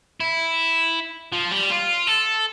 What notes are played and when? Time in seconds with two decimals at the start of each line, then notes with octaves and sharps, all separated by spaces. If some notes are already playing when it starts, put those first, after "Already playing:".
0.20 E4
1.32 F3
1.51 G3
1.70 F4
2.07 A4